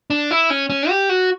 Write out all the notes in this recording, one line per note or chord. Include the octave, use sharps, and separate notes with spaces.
D4
E4
C#4
C#4
G4
F#4